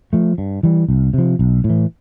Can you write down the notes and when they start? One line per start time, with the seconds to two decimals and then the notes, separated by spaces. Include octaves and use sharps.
0.13 F3 A3
0.38 G2
0.63 E3 G3
0.89 C2
1.14 C3 F3
1.39 B1
1.64 A2
1.70 E3